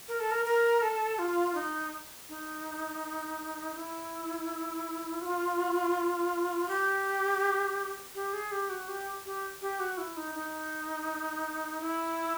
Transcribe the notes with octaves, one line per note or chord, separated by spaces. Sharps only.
A#4
A4
A#4
A#4
A4
F4
D#4
D#4
E4
F#4
F4
G4
G4
G#4
G4
F#4
G4
G4
G4
F#4
E4
D#4
D#4
E4